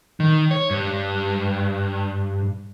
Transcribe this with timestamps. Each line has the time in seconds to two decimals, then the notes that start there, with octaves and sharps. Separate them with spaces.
0.20 D#3
0.51 C#5
0.71 G2